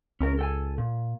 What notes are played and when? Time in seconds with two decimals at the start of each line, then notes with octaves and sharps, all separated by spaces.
0.21 C#2 C#4 A#4
0.39 A4 G5 G#5
0.78 A#2